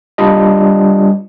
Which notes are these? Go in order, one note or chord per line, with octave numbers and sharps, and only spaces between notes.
G3 D4 F4 D#5